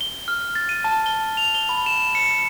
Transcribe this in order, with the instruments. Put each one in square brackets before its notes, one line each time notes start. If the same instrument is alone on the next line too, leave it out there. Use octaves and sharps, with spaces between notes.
[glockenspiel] G7
F6
A6
D#7
A5
G7
F7
G7
B5
E7
C#7